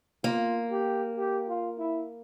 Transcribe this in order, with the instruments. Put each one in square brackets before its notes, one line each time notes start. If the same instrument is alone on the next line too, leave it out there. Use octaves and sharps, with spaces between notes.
[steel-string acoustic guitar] A#3 [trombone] F4
[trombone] G4
G4
F4
E4